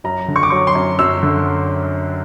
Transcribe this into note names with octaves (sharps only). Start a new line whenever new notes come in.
F#2 A#5
D3
C#6
D6
F#3 C#6
C6
F#2
F#2 E6
D3